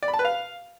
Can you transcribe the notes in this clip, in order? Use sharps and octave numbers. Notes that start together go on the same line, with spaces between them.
D5
B5
A5
B4
F5